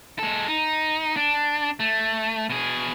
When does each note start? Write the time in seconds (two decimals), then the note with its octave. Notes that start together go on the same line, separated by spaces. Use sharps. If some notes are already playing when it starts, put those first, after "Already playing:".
0.19 G#3 A4
0.48 D#4
1.16 D4
1.80 A3
2.50 B2 G#4